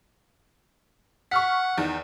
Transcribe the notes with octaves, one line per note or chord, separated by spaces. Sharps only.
F#5 C#6 F6 B6
E2 D#3